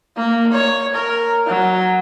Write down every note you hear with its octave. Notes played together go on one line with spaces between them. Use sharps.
A#3
C#5
A#4
F#3